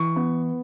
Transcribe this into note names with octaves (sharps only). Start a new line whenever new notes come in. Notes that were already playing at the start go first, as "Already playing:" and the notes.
Already playing: E3 C#6
B3